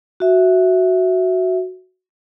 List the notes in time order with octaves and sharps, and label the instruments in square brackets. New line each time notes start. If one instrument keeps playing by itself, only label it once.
[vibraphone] F#4 E5